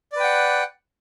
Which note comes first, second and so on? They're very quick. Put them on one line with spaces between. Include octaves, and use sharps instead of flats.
D5 B4 G5 F#5